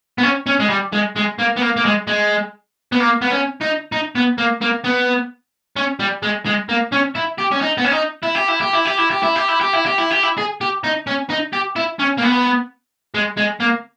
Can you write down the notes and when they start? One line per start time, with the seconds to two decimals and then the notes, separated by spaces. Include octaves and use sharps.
0.18 B3
0.23 C#4
0.46 C#4
0.60 G#3
0.69 G3
0.93 G#3
1.16 G#3
1.39 A#3
1.56 B3
1.61 A#3
1.77 A#3
1.85 G#3
2.07 G#3
2.92 B3
3.00 A#3
3.22 B3
3.31 C#4
3.61 D#4
3.92 D#4
4.15 B3
4.38 A#3
4.62 A#3
4.85 B3
5.77 C#4
6.00 G3
6.23 G#3
6.46 G#3
6.69 A#3
6.92 C#4
7.15 E4
7.38 G4
7.51 C#4
7.61 D#4
7.78 B3
7.84 C#4
7.92 D#4
8.23 E4
8.35 G4
8.48 E4
8.60 G4
8.73 E4
8.85 G4
8.98 E4
9.10 G4
9.23 E4
9.36 G4
9.48 E4
9.61 G4
9.73 E4
9.86 G4
9.98 E4
10.11 G4
10.23 E4
10.38 G#4
10.61 G4
10.84 D#4
11.07 C#4
11.30 D#4
11.53 G4
11.76 E4
11.99 C#4
12.17 A#3
12.22 B3
13.15 G#3
13.37 G#3
13.61 A#3